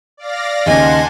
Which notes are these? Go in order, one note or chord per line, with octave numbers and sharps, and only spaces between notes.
D5 F5 A#6
D#2 C#3 D#5 F#5 G#5 A5 C6